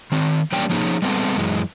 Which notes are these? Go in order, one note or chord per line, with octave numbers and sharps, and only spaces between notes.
D#3 C4
E3 G3 A#3 C#4 D4 G5
F3 A#3 C#4 D#4 G#4
G3 G#3 B3 C4 A4
F#2 E3 G#3